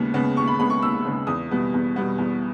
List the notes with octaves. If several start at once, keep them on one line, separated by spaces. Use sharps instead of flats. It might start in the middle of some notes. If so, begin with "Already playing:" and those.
Already playing: D#2 C#3 G#3 B3
C#3 G#3 B3
D#2 C#6
B5
C#3 G#3 B3 B5
C#6
D#2 E6
C#3 G#3 B3
E2 D#6
B2 G3 B3
E2
B2 G3 B3
E2